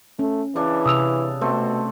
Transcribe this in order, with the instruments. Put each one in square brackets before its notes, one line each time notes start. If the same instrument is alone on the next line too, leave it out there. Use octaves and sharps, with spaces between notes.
[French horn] A3 [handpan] C#4
[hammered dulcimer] C#3 D4 [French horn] E3
[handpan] C3 [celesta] D#6 E6 F7
[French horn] B2 [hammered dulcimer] A3 C4